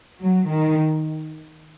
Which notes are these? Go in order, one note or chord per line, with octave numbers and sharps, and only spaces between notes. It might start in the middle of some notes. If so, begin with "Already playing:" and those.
F#3
D#3